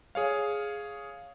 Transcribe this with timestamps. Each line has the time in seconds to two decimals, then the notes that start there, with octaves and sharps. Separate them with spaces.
0.15 G#4 C#5 F5